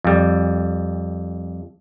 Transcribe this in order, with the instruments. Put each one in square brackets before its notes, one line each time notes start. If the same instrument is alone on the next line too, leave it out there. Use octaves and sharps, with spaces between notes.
[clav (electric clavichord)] F2 G3